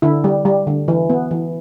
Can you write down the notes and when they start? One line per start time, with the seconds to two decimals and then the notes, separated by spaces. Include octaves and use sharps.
0.02 D3 E4
0.24 G3
0.45 G3
0.67 D3
0.88 E3
1.09 B3
1.31 E3